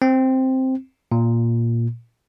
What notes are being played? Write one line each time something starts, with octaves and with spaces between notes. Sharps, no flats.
C4
A#2